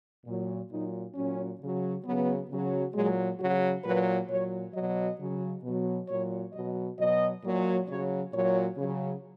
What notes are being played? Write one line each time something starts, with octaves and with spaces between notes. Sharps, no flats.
A#2 F#3
A#2 F#3 D#4
A#2 F#3 C#4
C#3 F#3
C#3 F#3 B3
C#3 F#3
A#2 F#3 G#3
C#3 F#3 F#4
A#2 F#3 B4
A#2 F#3 C#5
B2 F#3 D#5
C#3 F#3
B2 F#3
A#2 F#3 C#5
B2 F#3 D#5
B2 F#3 D#5
A#2 F#3
C#3 F#3 C#5
A#2 F#3 C#5
C#3 F#3